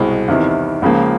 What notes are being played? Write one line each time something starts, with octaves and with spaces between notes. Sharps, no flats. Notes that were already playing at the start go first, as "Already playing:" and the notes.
Already playing: C2 B2 G#3
E2 C3 D#3
C#2 C#3 F3 A#3